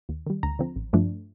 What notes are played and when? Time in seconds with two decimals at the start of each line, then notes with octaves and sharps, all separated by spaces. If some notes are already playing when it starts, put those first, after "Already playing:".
0.09 D#2
0.26 D#3 G3
0.43 D2 A#5
0.59 D3 F3 C4
0.76 A1
0.93 G2 F3 A3 D4